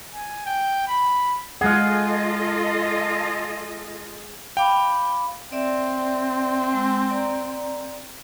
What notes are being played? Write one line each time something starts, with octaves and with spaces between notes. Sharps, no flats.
G#5
G5
B5
G#3 F4 G#4 A4 D#5 F5 F#5
F5 G5 B5 D6
C4 D5 E5
G#3 E6
D5 A#5